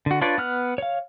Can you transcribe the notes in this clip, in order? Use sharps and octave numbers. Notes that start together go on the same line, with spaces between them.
D3 F#4
D4 F4 B4 C#5 D5
B3 F6 F#6
C#5 F5